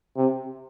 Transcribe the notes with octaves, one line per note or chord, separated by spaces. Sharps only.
C3